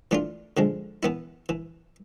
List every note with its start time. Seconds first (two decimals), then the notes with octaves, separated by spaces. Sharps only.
0.11 E3 A3 D4 F4
0.57 D3 F3 G#3
1.03 E3 B3 E4
1.49 E3